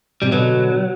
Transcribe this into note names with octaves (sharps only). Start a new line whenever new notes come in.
C3 G3
B2 D3 F#3